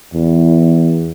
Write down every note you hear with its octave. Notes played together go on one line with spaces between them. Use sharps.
E2